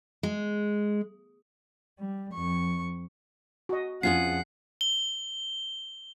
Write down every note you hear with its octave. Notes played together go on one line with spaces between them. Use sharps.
G#3
G3
F2 C#6
F#4 D#5
F2 C#4 F4 G#4 F#5 C7
G7